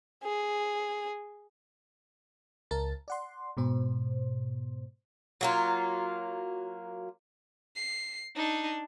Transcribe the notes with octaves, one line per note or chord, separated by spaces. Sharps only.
G#4
C#2 A#4 A5 A6
D5 F#5 C6
G#2 B2 C5
F#3 A#3 F4
C7
D4 D#4